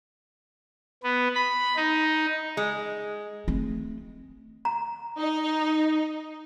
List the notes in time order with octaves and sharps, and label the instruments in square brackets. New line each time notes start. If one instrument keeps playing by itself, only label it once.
[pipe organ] B3
B5
D#4
[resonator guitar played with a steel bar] G#3
[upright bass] A3 C4
[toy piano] A#5
[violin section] D#4